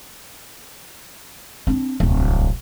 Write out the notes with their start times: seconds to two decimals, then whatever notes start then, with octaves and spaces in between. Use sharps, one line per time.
1.67 C4 D4
2.00 D1 C2